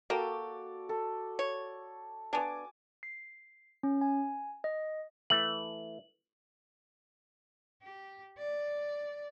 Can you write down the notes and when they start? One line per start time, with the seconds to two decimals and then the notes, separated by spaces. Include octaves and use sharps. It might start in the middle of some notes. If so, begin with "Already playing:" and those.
0.10 A#3 F#4 G4 A4 D5
0.89 A4
1.39 C#5
2.33 B3 D4 G#5 D6
3.03 C7
3.83 C#4
4.01 G#5
4.64 D#5
5.30 E3 A3 F#7
7.82 G4
8.38 D5